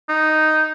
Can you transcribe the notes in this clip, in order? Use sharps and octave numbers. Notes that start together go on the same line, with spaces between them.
D#4